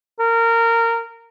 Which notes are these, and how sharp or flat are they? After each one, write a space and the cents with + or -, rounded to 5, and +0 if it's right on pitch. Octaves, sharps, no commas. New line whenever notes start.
A#4 -20